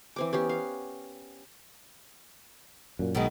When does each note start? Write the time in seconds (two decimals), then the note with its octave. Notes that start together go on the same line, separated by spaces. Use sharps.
0.16 E3 C4 D6
0.33 B3 C#4 G4
0.49 F5
2.99 F#2 A#2
3.15 B1 B2 D#3 G#3